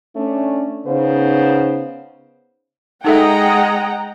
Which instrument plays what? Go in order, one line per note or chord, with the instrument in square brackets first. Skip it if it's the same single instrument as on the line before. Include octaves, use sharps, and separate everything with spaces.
[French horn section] A3 C#4 D4
C#3 B3 D#4 C5
[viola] G#3 D#5 [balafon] D#4 A4 E5 [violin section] F#5 G5 A#5